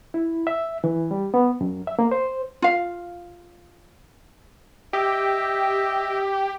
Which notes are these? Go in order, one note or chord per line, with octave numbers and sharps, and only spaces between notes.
E4
E5
E3
G3
B3
F#2
E5
A#3
C5
F4 F5
G4 D#5 E5